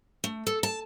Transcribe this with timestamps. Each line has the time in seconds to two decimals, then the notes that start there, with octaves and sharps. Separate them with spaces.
0.24 A3
0.47 A4
0.63 A5